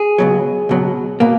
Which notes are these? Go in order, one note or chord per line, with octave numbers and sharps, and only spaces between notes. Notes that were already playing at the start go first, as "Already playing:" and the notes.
Already playing: G#4
C#2 B2 F#3
C#2 B2 F#3
B2 A#3